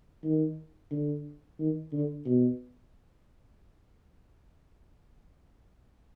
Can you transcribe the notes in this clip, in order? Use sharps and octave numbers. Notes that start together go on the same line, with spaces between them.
D#3
D3
D#3
D3
B2